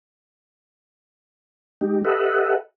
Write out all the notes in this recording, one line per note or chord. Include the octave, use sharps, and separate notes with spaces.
G#3 D#4 G4
G4 A4 B4 D#5 E5 F#5